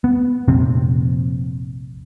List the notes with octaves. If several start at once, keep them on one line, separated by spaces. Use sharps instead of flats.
B3
F1 A#1 C3 C4